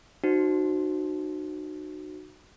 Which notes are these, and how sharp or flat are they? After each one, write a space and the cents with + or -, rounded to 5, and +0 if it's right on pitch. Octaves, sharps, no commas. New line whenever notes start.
D#4 -35 F#4 +0 C5 +0